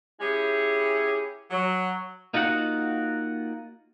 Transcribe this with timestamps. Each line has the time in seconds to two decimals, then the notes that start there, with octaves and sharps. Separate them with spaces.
0.20 C#4 E4 G4 G#4
1.51 F#3
2.33 A#3 D#4 F4 F#4 F#5